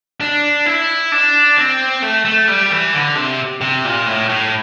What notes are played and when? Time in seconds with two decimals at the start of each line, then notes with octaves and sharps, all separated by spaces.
0.21 D4
0.66 E4
1.12 D4
1.57 C4
2.02 A3
2.25 A3
2.48 G3
2.70 E3
2.94 D3
3.15 C3
3.61 C3
3.85 A#2
4.07 A2
4.30 A2